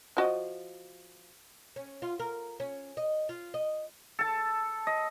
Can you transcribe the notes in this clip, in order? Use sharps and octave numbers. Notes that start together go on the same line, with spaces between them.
F3 F#4 D#5
C#4
F4
A#4
C#4
D#5
F4
D#5
A4 A5
D#5